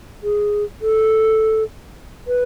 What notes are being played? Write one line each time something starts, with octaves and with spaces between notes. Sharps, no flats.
G#4
A4
B4